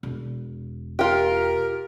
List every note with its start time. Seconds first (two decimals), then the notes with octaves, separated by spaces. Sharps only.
0.03 E1
0.99 F4 G4 A#4